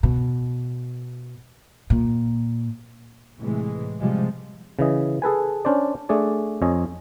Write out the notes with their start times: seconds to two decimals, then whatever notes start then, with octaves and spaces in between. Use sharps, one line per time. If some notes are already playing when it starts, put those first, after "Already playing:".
0.03 B2
1.90 A#2
3.39 A2 C3 E3 G#3
4.00 C3 F3 G3 G#3
4.79 C#3 E3 D#5
5.22 G#4 A4 B4 G#5
5.65 C#4 D4 C5 D5
6.09 A3 D4 G#4 D5
6.62 F2 C#5 D#5 G#5